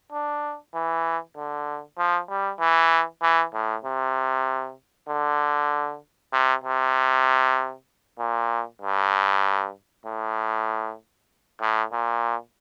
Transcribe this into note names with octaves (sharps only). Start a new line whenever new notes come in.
D4
E3
D3
F3
G3
E3
E3
A2
C3
D3
C3
C3
A#2
G2
A2
A2
A#2